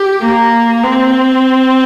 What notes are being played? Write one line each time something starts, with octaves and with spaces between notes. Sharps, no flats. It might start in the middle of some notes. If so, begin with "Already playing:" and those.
Already playing: G4
A#3
C4